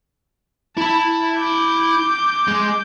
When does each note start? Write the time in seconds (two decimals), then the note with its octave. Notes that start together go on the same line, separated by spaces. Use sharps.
0.77 E4 A5 B5
1.39 D6 G6
2.48 G#3